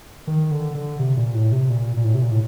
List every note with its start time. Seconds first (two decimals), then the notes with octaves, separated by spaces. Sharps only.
0.27 D#3
0.51 D3
0.75 D3
0.99 C3
1.17 A#2
1.34 A2
1.52 C3
1.70 A#2
1.97 A#2
2.04 A2
2.14 C3
2.22 A#2
2.31 A2